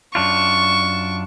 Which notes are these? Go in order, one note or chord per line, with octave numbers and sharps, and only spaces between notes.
F#2 D4 F4 C#6